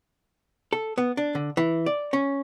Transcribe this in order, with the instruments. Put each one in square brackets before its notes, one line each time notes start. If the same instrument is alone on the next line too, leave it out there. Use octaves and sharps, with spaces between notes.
[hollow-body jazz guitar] A4
B3
D4
D3
E3
D5
C#4